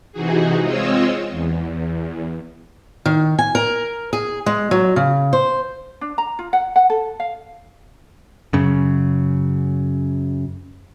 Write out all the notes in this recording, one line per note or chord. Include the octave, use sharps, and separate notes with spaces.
C3 E3 D#4 F#4 G#4
G#3 C4 F4 C#5 D#5 E6
E2
D#3
G#5
A#4
G#4
G#3
F#3
C#3
C5
D4
A#5
F4
F#5
F#5
A4
F5
F#2 C#3